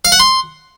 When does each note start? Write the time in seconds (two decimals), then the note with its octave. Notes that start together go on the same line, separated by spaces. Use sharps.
0.05 F5
0.12 F#5
0.20 C6